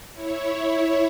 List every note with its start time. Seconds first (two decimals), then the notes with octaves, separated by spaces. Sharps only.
0.14 E4 C#5